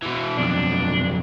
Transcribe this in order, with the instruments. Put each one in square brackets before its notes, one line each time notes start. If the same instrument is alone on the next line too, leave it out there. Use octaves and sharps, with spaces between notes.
[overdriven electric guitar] B2 E3
[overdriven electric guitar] B1 F2 [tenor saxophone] D4